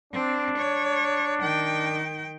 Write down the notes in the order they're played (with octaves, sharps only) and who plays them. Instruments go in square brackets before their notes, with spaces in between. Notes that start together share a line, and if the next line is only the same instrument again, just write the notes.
[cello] C4 [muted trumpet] D4
[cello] C#5
D#3 G5